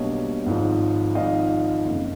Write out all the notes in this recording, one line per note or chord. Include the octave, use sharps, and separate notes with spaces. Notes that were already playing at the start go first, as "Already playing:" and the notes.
Already playing: B1 B2 G3 A#3 D4 C#5 D#5
G#1 G#2 F3
G#1 G#2 F3 D#5 F5
F#1 F2 C#3